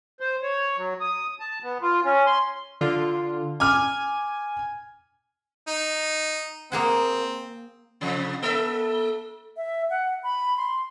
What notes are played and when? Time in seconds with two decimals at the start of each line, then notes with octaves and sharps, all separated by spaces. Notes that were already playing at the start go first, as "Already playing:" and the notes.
0.20 C5
0.43 C#5
0.77 F#3
1.01 D#6
1.40 A5
1.63 B3
1.82 F4
2.04 C#4
2.27 C6
2.81 D3 F4
3.60 G#5 D6 F6
5.68 D#4
6.72 A#3 C4 G#4 F#5
8.01 C3 F3
8.42 A#3 A4 E5
9.57 E5
9.90 F#5
10.23 B5
10.57 C6